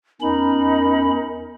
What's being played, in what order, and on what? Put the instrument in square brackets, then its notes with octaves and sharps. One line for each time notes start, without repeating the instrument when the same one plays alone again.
[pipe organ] E2 C#4 B5 [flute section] D#4 [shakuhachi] A#4